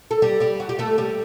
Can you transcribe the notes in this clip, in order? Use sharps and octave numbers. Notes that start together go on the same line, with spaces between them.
A4
G3 G4
G3 G4
F#4
G4
A3 A4
G3 G4